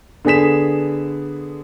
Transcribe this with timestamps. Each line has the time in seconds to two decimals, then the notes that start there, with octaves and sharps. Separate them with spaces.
0.25 D3 B3 G#4 B6 E7